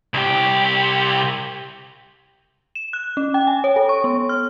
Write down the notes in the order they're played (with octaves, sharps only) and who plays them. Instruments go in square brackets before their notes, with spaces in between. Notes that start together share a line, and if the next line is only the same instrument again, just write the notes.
[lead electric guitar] C2 G4
[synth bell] E7
F#6
C#4
G5
G#5
C#5
A4
C#6
B3
F6